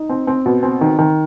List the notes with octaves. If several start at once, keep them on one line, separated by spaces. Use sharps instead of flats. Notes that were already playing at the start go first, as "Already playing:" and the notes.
Already playing: D#4
C4
C4
B2
C4
D#3
D#3